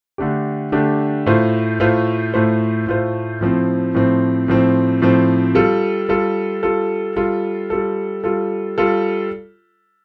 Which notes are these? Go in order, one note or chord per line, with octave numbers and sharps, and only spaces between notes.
D3 A3 D4 G4
D3 A3 D4 G4
A2 A3 F4 C5
A2 A3 F4 C5
A2 A3 F4 C5
A2 A3 F4 C5
A2 F3 C4
A2 F3 C4
A2 F3 C4
A2 F3 C4
G3 F4 A4
G3 F4 A4
G3 F4 A4
G3 F4 A4
G3 F4 A4
G3 F4 A4
G3 F4 A4